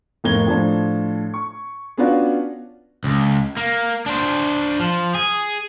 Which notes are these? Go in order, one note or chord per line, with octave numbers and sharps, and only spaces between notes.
F1 A2 A#3 D#5 G#6 G7
A2 F3 D4 A5
C#6
B3 C#4 D4 F4 F#4 B4
C#2
A#3
D4 C5
F3
G#4